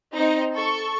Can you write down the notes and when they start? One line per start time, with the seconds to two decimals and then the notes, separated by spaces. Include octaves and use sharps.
0.14 C4 D#4 D#5
0.55 A4 C#6